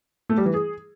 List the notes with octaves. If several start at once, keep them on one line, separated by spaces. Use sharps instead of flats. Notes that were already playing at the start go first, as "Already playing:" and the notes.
A3
G3
E3
G#4